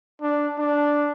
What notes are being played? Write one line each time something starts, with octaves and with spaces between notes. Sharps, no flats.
D4
D4